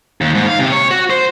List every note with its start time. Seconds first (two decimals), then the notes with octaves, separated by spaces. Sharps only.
0.21 D#2
0.35 G#2
0.47 F5
0.59 C3
0.72 C#5
0.91 F#4
1.10 C5